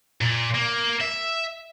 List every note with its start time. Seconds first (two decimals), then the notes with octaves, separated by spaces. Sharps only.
0.21 A#2
0.54 A#3
1.00 E5